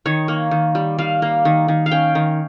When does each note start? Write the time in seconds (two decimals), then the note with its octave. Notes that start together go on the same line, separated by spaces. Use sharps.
0.06 D#3 C#5
0.28 A#3
0.51 D#3
0.75 G3
0.99 G3 F5
1.22 A#3
1.45 D#3
1.68 D#3
1.86 F5
1.92 C#4 G5
2.15 D#3